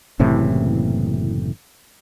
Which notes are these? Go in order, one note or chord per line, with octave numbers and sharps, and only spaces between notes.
F#1 A2 C3 E3